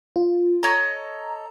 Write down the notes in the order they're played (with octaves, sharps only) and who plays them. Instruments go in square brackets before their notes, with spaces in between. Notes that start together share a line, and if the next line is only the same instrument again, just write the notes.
[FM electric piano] F4
[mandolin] A4 C#5 D#5 [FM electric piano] A#5